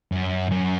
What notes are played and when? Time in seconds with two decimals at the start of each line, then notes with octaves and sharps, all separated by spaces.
0.12 F#2
0.52 F#2